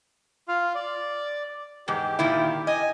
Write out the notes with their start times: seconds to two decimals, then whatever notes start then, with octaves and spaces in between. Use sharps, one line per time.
0.48 F4 F5
0.75 D5
1.88 E2 G#2 G4
2.19 A#2 D#3 E4
2.67 D#5 G#5